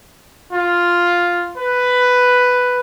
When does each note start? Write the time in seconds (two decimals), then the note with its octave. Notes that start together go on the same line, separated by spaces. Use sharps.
0.53 F4
1.58 B4